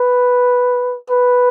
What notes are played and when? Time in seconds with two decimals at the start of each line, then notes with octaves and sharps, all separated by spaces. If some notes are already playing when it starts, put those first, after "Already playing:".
Already playing: B4
1.10 B4